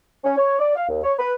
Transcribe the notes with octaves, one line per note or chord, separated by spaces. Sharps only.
C#4
C#5
D5
F5
D#2
C#5
B4